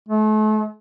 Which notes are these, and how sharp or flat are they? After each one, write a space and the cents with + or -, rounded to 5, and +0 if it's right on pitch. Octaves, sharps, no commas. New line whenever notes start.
A3 -35